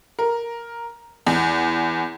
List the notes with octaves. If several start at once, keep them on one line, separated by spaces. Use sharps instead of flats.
A#4
E2